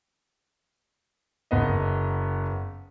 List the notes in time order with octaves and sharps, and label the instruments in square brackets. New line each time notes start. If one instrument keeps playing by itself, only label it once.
[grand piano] F#1 B3 D#5